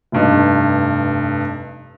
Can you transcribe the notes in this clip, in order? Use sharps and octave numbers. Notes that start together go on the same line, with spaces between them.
F1 G2 D#4